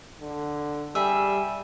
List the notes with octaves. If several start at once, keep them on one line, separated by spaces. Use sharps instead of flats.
D3
G3 G#4 E5